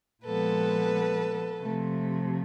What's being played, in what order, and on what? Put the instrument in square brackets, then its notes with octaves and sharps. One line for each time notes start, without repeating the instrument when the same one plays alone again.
[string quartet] A#2 F3 G#3 B3 A4 B4
C3 F3 A3